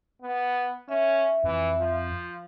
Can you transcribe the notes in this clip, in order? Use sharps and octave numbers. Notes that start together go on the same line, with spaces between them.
B3
C#4 E5
F2 E3
F3